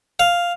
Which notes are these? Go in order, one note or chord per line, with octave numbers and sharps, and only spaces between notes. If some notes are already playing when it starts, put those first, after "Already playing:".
F5